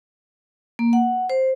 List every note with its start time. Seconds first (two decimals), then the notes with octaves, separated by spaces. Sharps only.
0.79 A#3
0.93 F#5
1.30 C5